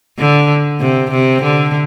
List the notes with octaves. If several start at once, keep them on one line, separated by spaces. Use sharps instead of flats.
D3
C3
C3
D3